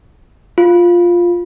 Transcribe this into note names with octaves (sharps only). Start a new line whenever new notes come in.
F4